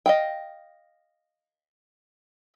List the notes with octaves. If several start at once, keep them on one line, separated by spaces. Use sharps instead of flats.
D#5 F5 G5